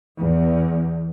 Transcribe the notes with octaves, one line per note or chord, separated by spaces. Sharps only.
E2